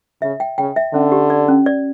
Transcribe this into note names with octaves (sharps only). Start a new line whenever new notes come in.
C#3 E5
G5
C#3 G5
E5
D3 C#4
G4
D5
C#4
D5